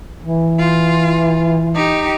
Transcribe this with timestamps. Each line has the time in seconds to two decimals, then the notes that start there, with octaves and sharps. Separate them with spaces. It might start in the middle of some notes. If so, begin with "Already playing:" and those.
0.23 E3
0.59 F4
1.74 D#4 G4